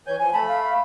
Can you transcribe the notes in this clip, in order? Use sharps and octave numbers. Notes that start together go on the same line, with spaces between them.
E3 C#5 G#5 G6
F3 G#5
A3 A5 B5
F5